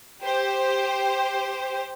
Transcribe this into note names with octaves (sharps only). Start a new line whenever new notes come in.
G4 C5